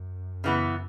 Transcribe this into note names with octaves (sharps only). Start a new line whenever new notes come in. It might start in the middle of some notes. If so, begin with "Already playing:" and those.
Already playing: F#2
C#3 E3 B3